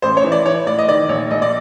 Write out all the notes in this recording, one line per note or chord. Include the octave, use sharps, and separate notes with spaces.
A1 C5
C#5
E3
D5
E3 C#5
A2 D5
D#5
D#3 D5
A#1 C#5
A#1 D#5
D5